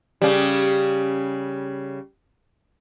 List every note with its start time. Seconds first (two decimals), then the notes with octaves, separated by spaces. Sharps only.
0.22 C#3 G3